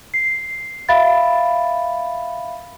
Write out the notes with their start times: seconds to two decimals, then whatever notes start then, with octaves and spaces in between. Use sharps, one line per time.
0.14 C7
0.89 E5 F5 B5 A6